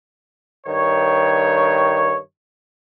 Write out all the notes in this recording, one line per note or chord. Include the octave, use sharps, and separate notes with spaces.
G2 D#3 C#5